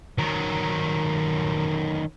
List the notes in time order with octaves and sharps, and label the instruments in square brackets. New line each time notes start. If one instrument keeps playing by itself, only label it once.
[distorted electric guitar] D#3 F#3